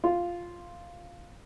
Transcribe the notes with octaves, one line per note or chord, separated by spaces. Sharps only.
F4